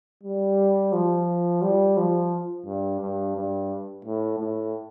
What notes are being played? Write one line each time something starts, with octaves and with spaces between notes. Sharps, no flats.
G3
F3
G3
F3
G2
G2
G2
A2
A2